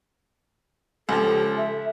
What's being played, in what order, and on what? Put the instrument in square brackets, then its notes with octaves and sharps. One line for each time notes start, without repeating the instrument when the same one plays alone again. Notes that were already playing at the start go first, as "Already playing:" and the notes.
[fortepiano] C#2 F3 [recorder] G4 [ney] A4
[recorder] E5